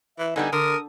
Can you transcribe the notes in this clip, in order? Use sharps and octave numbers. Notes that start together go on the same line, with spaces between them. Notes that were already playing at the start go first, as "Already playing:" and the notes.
E3 E5
D3 G3 B3 D#4 G#5
D3 A#4 D#6